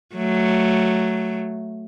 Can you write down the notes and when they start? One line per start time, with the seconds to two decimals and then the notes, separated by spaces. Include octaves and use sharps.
0.15 F#3 A3